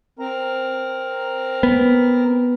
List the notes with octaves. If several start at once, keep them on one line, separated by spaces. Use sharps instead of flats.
C4 A#4 A#5
B3